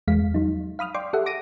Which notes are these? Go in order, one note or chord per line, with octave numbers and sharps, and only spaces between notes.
E2 G#3 F5 B6
F#3 D#4
F5 B5 D#6 F6
D5 G5 C6 D6
G4 A4 E5 F#5
D6 A#6 D7 D#7